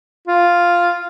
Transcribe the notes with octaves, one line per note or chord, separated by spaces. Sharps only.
F4